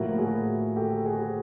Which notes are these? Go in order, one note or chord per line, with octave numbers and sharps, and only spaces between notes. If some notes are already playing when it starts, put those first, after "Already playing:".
Already playing: A2 F3 A#3 E4 F#4
F#4 G#4
G4 A4
F#4 G#4